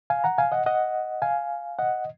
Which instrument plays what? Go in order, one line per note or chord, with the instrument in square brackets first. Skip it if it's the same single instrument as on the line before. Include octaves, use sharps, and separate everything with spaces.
[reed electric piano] F5 G#5
F#5 A#5
F5 G#5
D#5 F#5
D#5 F#5
F5 G#5
D#5 F#5